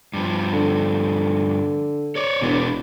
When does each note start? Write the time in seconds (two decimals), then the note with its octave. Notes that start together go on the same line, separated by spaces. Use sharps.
0.13 G2 F3
0.54 D3
2.16 C#5 D5
2.41 E1 B2 D4